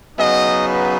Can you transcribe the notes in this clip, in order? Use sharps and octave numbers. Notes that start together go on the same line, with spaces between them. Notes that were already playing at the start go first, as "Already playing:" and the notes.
C#3 F#3 B3 D#4 D#5
B4